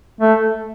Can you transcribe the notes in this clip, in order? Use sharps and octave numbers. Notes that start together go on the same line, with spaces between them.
A3